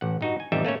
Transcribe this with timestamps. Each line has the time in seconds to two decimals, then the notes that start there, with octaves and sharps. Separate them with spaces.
0.01 A1 F#5
0.21 G2 D#4 F#4
0.40 G#5
0.52 A1 F2 G3 D#4 E5
0.65 A3 A#3 C#4 C#5